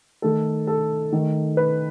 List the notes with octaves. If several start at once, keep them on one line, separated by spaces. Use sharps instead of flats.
D#3 A3 A4
A4
D#3 A3
B4